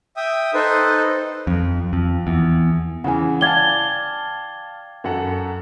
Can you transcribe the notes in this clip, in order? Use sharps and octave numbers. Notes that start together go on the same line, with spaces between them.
E5 G5 D#6
D#4 A4 B4 C5
F2
F2
E2
C#3 E3 F#5 G#5
D5 F5 G5 A5 D6 G#6 A6 G7
F#2 A4 F#5